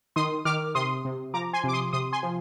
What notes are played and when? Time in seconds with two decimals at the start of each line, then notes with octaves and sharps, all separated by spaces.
0.16 D#3 C6 D#6
0.45 D#3 D6 F6
0.75 C3 C6 D#6
1.05 C3
1.34 F3 A#5 D6
1.53 G#5 C6
1.64 C3 D6
1.73 C6 D#6
1.93 C3 C6 D#6
2.12 G#5 C6
2.23 F3